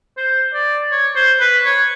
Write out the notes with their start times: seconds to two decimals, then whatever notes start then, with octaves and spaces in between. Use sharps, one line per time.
0.17 C5
0.54 D5
0.91 C#5
1.16 C5
1.40 B4
1.65 C#5